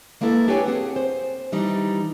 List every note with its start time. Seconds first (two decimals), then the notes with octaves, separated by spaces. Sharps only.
0.21 G#3 A#3 B3 E4 A4 A#4
0.48 D4 G4 B4 C#5 G5 G#5
0.66 C4 G#4 F#5
0.96 C5
1.52 D#3 E3 G3 D4 D#4